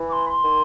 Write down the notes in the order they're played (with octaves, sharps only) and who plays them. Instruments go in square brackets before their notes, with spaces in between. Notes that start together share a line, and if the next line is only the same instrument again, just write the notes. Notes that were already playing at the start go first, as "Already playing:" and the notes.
Already playing: [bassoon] E3
[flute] D6
C6
B5
C6
[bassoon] D#3